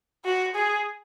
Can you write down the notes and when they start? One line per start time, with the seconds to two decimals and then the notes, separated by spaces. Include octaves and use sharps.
0.25 F#4
0.55 G#4